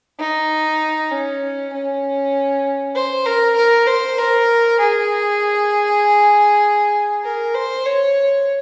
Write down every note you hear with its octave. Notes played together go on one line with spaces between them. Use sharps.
D#4
C#4
C#4
C5
A#4
A#4
C5
A#4
G#4
A#4
C5
C#5